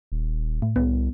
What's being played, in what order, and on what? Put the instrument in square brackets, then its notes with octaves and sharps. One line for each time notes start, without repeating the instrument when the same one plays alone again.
[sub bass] D#1
[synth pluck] A2
[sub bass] C2 [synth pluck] B3